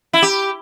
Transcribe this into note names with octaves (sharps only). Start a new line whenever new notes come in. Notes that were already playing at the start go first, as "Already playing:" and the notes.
E4
G4